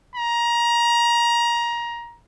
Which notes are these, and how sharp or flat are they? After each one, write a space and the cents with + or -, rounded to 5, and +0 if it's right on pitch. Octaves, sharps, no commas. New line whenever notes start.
A#5 +20